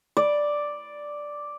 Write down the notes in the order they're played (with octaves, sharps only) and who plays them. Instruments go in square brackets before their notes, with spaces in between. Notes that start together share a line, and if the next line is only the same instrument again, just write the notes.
[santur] D5